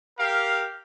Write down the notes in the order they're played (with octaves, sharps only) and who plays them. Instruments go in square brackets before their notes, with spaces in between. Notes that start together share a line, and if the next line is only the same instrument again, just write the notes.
[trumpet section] G4 A#4 F5